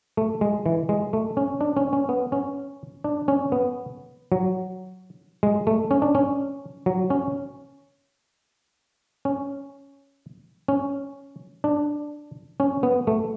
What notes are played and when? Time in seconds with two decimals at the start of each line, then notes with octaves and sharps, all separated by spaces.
0.17 A3
0.41 G#3
0.66 E3
0.89 G#3
1.13 A3
1.37 C#4
1.61 D4
1.77 C#4
1.93 C#4
2.09 B3
2.32 C#4
3.04 D4
3.28 C#4
3.52 B3
4.32 F#3
5.43 G#3
5.67 A3
5.91 C#4
6.02 D4
6.15 C#4
6.86 F#3
7.10 C#4
9.25 C#4
10.68 C#4
11.64 D4
12.60 C#4
12.83 B3
13.07 A3